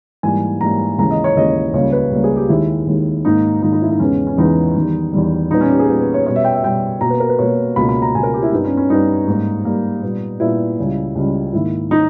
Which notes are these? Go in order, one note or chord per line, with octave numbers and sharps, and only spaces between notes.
G#2 E3 G3 A#3 G#5
G#2 E3 G3 A#3 A#5
D#2 C#3 E3 G#3 A#5
D#5
C#5
D#2 C#3 E3 G#3 D#5
C#2 C#3 G3 A#3 C#5
B4
C#2 C#3 G3 A#3
G#4
G4
D#2 D#3 G#3 E4
D#2 D#3 G#3
G#2 D#3 A#3 D#4
G#2 D#3 A#3 D#4
D#4
E4
D#4
E2 C#3 E3 G#3 B3 C#4
C#4
E2 C#3 E3 G#3 B3 D#4
E2 D#3 G3
E2 D#3 G3
A#2 G3 B3 D#4
C#4
G4
G#4
A#2 G3 B3
B4
C#5
B2 G3 B3 C#5
E5
G5
E5
B2 G3 B3 G5
B2 A#3 A#5
B4
A#4
B4
B2 A#3 C#5
C#2 B2 A#3 B5
B5
A#5
C#2 B2 A#3 G#5
A#4
G4
E4
G2 G3 B3 D#4
C#4
C#4
G2 G3 B3 D#4
G#2 G3 A#3
G#2 G3 A#3
A#2 G3 B3
A#2 G3 B3 E4
C#2 C#3 G3
C#2 C#3 G3
G#2 D#3 A#3 E4
D#3 D#4